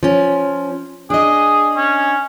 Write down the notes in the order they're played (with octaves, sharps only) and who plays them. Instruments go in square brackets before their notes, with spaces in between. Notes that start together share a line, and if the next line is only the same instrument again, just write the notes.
[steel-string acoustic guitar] F3 C#4
[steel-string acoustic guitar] D4 D#5 [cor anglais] G#4
[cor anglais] C#4